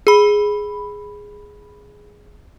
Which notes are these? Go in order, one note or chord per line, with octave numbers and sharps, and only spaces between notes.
G#4 B5